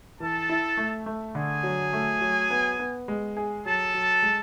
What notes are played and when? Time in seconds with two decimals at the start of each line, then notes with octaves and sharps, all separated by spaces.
0.19 E3 A4 A5
0.49 E4
0.77 A3
1.06 A3
1.35 D3 G#4 G#5
1.63 F#3
1.93 A3
2.21 F#3
2.50 B3
2.79 B3
3.08 G#3
3.37 G#4
3.65 F#3 A4 A5
3.94 F#3
4.22 G#3